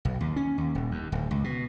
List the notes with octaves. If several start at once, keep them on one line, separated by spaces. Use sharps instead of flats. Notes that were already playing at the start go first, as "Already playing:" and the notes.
B1
D#2
C#4
D#2
D#1
D#2
D1
C#2
B2